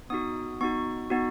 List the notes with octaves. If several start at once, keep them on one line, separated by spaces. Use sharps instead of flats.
B3 D#4 F#4 D#6
B3 D#4 F#4 C#6
B3 D#4 F#4